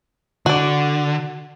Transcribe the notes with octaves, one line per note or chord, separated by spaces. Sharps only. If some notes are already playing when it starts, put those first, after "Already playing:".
D3 F#4 D5